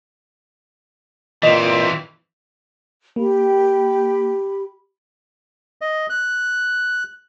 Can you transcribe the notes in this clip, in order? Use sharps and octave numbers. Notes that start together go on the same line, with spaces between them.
A#2 E3 C4 D#5
A#3 G4 B5
D#5
F#6